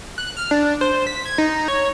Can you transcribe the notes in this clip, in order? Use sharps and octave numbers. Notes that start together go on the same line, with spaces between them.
F#6
F6
D4
C5
B6
G#6
D#4
C#5